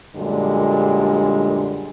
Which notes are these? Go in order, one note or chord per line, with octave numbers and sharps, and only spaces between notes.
F#2 A#2 D3 G3 G#3 D4